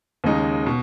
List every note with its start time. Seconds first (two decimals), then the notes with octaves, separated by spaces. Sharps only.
0.24 D#2 C#3 G#3 D#4
0.66 B2